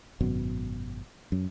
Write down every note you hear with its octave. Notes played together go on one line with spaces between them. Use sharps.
G#1 F#2 B2
F#2